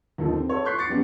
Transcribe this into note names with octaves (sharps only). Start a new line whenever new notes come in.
D#2 F3 D#4 A4
C4
A4 C#5
C6 C#6 F#6 G6 B6 C7
D6 A6 C7 C#7
F1 B3 C#4 G4